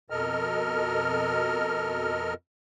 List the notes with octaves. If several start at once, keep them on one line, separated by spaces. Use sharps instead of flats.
F2 B2 A4 A#4 D#5 F6